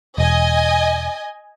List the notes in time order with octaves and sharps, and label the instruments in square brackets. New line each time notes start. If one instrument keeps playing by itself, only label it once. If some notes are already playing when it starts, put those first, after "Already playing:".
[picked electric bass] E1 [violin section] D#5 G#5